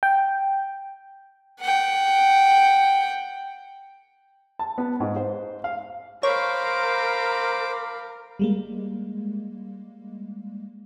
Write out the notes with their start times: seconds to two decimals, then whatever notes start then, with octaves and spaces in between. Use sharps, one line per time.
0.03 G5
1.60 F#5 G5
4.59 A5
4.78 B3
5.00 G#2
5.16 C5
5.64 F5
6.23 A#4 C5 C#5 F5 B5 D6
8.39 G3 G#3 A#3